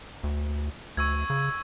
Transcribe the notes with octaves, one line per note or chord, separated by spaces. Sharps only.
D2
D2 C#6 E6 G#6
C#3